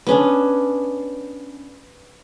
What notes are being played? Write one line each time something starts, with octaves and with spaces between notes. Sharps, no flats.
B3 C#4 D4